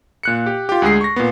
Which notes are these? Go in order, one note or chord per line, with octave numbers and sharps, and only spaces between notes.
A#2 F#6 C#7
G4
F4 G4
D2 G#3 G#4 C7
C#6 A#6
A#2 B3